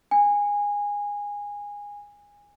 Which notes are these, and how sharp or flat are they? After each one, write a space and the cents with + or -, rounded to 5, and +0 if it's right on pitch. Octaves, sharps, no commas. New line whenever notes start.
G#5 -20